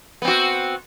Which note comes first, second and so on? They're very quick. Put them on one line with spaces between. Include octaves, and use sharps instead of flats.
B3 C4 F#4